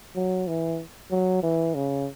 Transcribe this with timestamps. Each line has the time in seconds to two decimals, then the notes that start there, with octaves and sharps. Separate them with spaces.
0.15 F#3
0.47 E3
1.11 F#3
1.43 E3
1.75 C#3